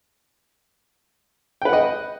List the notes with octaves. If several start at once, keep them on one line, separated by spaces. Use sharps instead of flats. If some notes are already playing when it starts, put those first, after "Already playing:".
B4 D#5 F#5 G5